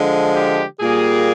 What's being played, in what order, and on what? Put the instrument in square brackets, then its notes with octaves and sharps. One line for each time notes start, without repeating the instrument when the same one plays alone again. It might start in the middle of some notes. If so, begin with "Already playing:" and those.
Already playing: [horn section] D3 F3 G#3
G4
A#2 G3 A#3 G#4